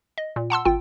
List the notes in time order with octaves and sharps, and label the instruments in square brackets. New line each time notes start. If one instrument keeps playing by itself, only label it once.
[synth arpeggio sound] D#5
A#2
F#5 A5 C6 E6
G#1 F4 G5